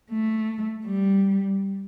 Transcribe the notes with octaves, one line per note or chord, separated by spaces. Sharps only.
A3
G3